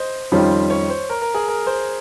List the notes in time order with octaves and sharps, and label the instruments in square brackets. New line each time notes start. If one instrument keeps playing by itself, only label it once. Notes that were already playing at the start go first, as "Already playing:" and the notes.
Already playing: [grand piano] C5 D#5
[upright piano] F2 D#3 G3 C#4 F4 [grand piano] C5
[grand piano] C#5
C5
A#4
A#4
G#4
A#4
C5